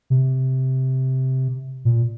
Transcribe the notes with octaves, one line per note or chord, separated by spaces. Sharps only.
C3
A#2